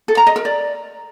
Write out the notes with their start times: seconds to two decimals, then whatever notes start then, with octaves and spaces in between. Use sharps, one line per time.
0.08 A4
0.17 A#5
0.27 D#5
0.36 A#4
0.45 D5